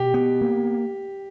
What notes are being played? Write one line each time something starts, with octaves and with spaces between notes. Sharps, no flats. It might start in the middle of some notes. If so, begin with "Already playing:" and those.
Already playing: B2 G4
B3 G4
A#3